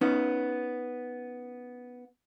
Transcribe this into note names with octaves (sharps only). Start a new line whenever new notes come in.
B3 C#4 D#4